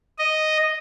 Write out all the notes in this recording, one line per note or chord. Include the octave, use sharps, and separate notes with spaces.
D#5